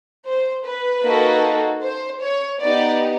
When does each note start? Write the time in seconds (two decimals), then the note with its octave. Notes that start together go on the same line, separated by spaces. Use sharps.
0.26 C5
0.64 B4
1.04 A#3 D#4 F#4 A4
1.82 C5
2.22 C#5
2.61 B3 D#4 G4 D5